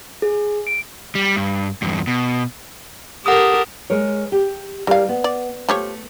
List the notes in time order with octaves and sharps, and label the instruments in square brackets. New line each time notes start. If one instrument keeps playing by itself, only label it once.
[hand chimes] G#4
D7
[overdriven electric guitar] G3
G2
E2 G2
B2
[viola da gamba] G4 A4 A#4 [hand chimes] F#5 D#6
[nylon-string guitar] G#3 A#4 C#5
G4
[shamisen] E3 F5 [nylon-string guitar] G3 A#4
[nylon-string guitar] B3
[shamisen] D5
[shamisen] F3 G4 C#5 [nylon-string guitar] A3